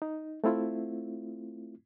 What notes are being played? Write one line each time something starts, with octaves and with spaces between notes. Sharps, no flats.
D#4
A3 C4 E4 F4